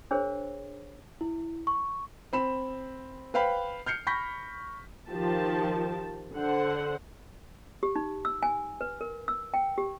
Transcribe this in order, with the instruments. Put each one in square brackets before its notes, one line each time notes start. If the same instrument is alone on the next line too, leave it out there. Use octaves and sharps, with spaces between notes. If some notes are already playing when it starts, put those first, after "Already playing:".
[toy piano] D4 G#4 A#4 C5 C#5
[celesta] E4
C#6
[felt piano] C4 B5 E7
B4 C5 F5 G5 B5
F6 G6 C7 C#7
B5 C#6 G6 A#6 B6
[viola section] D#3 F3 G4 A5
D3 C5 F#5
[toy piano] G4
D#4
E6
G#5
B4
A#4
E6
G5
G4